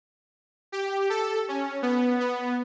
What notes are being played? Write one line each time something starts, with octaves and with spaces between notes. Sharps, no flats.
G4
A4
C#4
B3
B3